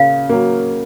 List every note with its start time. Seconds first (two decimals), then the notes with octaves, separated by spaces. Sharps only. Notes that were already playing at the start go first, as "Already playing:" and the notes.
Already playing: C#3 A#3 F5
0.29 F#3 A#3